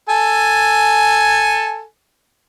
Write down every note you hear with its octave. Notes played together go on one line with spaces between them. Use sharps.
A4 G#5